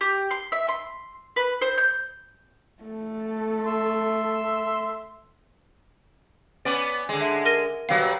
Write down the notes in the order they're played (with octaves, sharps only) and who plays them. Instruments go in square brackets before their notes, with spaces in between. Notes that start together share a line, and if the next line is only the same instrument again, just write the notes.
[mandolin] G4
C6
E5
C6
B4
C5
G6
[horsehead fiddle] A3 A4
[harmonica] E5 C6
[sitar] B3 C#4 D5
D3 G#3
[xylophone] E5
A#4 A#6 D#7
[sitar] B2 F#3 G3 [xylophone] F5